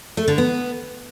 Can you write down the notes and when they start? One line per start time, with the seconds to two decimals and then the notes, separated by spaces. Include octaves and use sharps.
0.17 A3
0.28 D3
0.38 B3